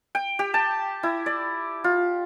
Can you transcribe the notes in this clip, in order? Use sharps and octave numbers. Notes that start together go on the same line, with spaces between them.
G5
G4
A5
E4
D5
F4